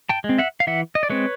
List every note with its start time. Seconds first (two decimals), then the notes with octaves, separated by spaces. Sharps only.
0.09 G5 A5
0.24 G#3
0.29 C4
0.38 E5 F#5
0.60 F5
0.67 E3 E5 F#5
0.95 D#5
1.03 D5
1.10 G#3 C4 B4 C#5